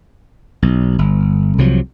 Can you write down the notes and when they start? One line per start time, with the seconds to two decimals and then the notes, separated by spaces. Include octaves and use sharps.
0.62 B1
0.99 G1
1.58 C2 C3 F3 F#3